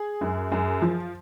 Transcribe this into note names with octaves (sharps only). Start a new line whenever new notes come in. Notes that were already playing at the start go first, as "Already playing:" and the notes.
Already playing: G#4
F#2
F#2
F3